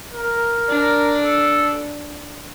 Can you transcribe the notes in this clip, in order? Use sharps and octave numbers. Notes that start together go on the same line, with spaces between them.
A#4
D4
A4